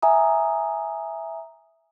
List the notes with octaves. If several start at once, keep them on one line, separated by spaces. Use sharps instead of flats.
E5 G#5 A#5 D#6